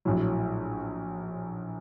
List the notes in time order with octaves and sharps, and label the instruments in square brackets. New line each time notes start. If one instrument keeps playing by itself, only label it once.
[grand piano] A#1 A2 F#3